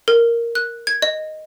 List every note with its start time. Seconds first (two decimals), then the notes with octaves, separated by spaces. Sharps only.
0.08 A#4
0.55 F#6
0.87 G#6
1.02 D#5